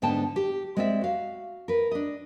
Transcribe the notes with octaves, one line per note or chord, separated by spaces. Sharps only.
G#2 D3 B3 G5 A5
G4
G#3 C4 C5 D5 E5
F#4 F5
A#4 B4
D4 D#5